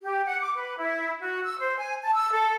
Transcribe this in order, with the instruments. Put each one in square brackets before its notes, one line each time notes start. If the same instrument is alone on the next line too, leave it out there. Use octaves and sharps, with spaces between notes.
[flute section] G4
F#5
D6
B4
E4
F#4
E6
C5
G#5
A5
E6
A4